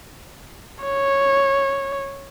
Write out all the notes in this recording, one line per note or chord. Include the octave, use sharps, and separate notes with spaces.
C#5